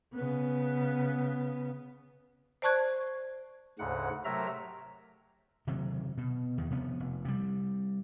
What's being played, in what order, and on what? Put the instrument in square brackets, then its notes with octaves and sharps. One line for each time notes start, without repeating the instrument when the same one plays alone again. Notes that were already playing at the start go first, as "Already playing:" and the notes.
[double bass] C#3 B3
[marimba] C5 D5 A5 C#6 F#6 G#6
[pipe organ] D2 G#2 C#3 F#5
C3 F#3 A3 A#4 E5 A#5
[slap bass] F#1 C3 D#3 F#3
B2
E2 D#3
C3 F3 A3 B3
F1
C3 G3